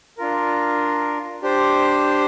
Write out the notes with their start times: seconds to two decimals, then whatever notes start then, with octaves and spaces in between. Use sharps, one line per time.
0.18 D4 F4 A#4
1.42 D4 G4 C5